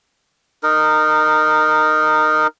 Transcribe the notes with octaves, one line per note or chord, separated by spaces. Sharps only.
D#4 A#4